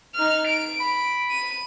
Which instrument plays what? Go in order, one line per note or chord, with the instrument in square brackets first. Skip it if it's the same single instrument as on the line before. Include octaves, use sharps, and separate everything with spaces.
[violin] D#4 F6
D7
[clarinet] B5
[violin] D#7